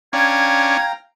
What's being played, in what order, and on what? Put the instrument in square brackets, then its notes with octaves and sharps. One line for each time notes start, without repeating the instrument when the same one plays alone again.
[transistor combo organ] C#4 D4 [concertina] F5 G5 A#5 [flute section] G#6